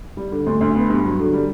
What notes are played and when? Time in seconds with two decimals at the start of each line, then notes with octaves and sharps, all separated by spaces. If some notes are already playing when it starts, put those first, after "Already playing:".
0.17 G3
0.32 D3
0.46 D2
0.61 D2
0.75 B3
0.90 G2
1.05 F#3
1.19 D3
1.33 G3